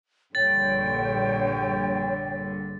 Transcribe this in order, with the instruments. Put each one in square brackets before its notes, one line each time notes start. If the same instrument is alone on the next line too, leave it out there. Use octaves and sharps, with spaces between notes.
[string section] A#1 G2 D3 [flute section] C#5 G5 [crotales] A6